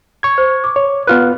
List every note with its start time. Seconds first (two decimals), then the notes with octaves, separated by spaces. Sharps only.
0.23 C#6 G#6
0.38 C5
0.64 D6
0.76 C#5
1.07 B3 F4 B4 F6 F#6